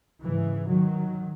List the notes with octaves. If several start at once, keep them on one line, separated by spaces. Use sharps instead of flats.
G#2 C#3 E3
D#3 F#3